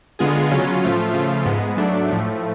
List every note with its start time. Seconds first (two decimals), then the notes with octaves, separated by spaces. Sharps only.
0.19 D3 G#3 B3 F4 G#4
0.51 C#3 F#3 C#4 F4
0.83 A2 F3 A3 F4
1.14 C#3 F3 A3 F4
1.45 G#2 G#3 B3
1.77 G#2 F#3 A3 D4
2.08 A2 F3 A3